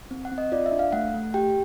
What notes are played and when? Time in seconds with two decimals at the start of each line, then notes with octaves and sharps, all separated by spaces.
0.11 C4
0.25 F#5
0.32 C4
0.38 D#5
0.52 F4 D5
0.66 E5
0.72 D4
0.79 F5
0.93 A3 F#5
1.14 A3
1.34 G4 G5